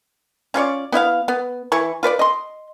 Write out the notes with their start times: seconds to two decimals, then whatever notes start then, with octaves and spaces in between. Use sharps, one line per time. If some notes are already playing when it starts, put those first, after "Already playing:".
0.54 C#4 F4 C#5 D5
0.92 B3 E4 E5 F5
1.28 B3
1.72 E3 E4 C#6
2.03 F4 B4 C#5 D5
2.19 D#5 C6